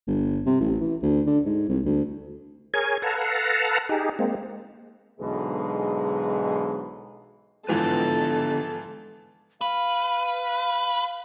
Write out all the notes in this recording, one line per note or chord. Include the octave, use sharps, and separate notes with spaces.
G1
C3
A1
E3
D2
D3
G#2
C2
D2
G#4 A#4 C#5 G#5 G#6
A4 B4 F5 F#5 A5 A#5
D#4 G4 G#4
G#3 A#3 C4
B1 G#2 B2 D3 E3 G#3
G#2 D3 E3 F3 B3 A4 B4
B4 F5